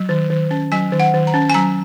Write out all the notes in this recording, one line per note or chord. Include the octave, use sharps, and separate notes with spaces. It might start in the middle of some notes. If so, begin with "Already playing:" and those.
Already playing: F#3
D#3
D#3
C#4
F#3 G#5
D#3
F#5
D#3
A#5
C#4
G#5
F#3 A#5